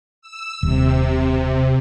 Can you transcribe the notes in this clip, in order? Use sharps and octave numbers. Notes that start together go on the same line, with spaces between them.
E6
D#1 C3